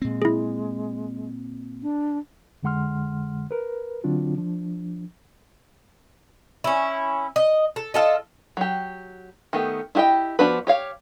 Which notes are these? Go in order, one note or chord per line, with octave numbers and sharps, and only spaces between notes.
A#2 G#3 C4
E4 G#4
D4
F2 D3 G#3 F#5 C6 F6
A#4 B4
D3 F#3 C4 D4 F4 F#4
F3 D4
C#4 E4
D#5
A4
F4 A4 D#5
F#3 G4
D#3 A3 B3 G4
E4 F4 G4 D#5 G5
F3 B3 D4 F#4 B4
G4 C#5 F5